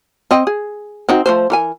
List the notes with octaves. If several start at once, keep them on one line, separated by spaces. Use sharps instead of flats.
C4 D#5 G5
G#4
C4 D#4 F#4
F3 A3 C5
E3 A#4 G#5